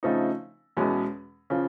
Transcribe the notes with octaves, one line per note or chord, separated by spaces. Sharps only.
C#3 F3 A3 C4 D#4
E2 B2 G#3 C#4
C#3 F3